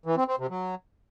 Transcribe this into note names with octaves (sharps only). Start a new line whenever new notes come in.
E3
C4
C4
C3
F#3